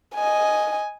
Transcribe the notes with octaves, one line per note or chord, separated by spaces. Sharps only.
D#5 G#5